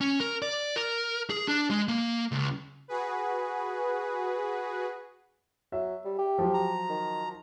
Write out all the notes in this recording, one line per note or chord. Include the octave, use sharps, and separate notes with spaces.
C#4
A#4
D5
A#4
G#4
D4
G#3
A#3
C#2
F#4 G#4 B4
F#3 E5
G3
G4
F3 F#3
A#5
D#3